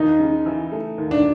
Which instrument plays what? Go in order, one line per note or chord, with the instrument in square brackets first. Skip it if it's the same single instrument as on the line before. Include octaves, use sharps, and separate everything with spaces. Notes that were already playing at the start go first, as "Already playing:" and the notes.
Already playing: [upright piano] D#2 [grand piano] D#4
[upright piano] C#3
E3
A3
D#2
[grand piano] D4